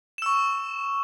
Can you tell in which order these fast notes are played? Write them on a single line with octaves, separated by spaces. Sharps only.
E7 E6 C#6